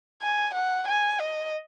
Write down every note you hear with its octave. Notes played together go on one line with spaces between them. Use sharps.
G#5
F#5
G#5
D#5